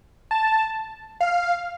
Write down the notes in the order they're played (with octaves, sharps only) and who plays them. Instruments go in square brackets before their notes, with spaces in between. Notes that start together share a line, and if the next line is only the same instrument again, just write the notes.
[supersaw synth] A5
F5